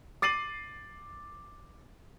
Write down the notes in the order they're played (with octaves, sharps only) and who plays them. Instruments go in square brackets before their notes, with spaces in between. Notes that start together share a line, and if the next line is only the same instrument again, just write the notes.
[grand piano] D6 A6 C7 D#7 F#7